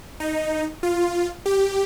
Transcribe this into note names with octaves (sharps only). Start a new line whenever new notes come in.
D#4
F4
G4